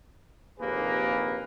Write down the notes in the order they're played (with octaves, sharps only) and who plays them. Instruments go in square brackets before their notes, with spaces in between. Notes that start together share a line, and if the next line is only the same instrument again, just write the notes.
[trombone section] A#1 D#2 C3 A#3 G#4 B4